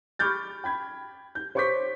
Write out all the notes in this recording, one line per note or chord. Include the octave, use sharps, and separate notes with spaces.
B5 C#6 D6 F6 G6 A6
G5 B5 G#6
G6
C5 C#5 C#6 D6 G6 B6